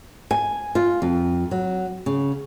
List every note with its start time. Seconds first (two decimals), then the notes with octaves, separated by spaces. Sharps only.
0.31 G#5
0.75 F4
1.02 F2
1.51 F#3
2.06 C#3